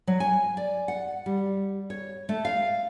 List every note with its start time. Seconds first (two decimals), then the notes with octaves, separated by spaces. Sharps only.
0.07 F#3
0.20 G#5
0.57 D5
0.88 F#5
1.26 G3
1.90 C#5
2.29 A3
2.45 F5